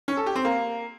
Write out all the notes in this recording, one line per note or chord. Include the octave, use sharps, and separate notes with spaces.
C#4
A4
G4
C4
A#3